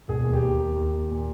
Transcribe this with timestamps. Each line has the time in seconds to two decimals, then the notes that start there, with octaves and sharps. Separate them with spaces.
0.08 E1 G#4
0.25 D#2
0.33 G4
0.42 D#2
0.59 D#2
0.76 D#2
0.93 D#2
1.11 A#2